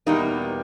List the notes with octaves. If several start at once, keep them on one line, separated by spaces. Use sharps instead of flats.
E2 B2 G3 A#3 D#4